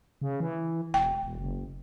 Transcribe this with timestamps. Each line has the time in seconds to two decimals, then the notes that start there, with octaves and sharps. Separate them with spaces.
0.22 C#3
0.40 E3
0.94 E1 G5
1.23 E1
1.38 F#1